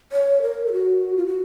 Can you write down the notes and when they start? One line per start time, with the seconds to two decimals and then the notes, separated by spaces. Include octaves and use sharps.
0.12 C#5
0.42 A#4
0.66 A4
0.72 F#4
1.17 F4
1.26 F#4